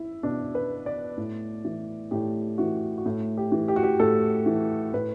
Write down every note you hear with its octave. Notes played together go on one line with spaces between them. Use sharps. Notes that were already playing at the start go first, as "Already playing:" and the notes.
Already playing: E4
B2 D4
B4
D5
A2
E3
A2 G4
E3 F#4
F#4
A2 E4
G4
E3
G4
F#4
G4
A2 A4
E3
A2 B4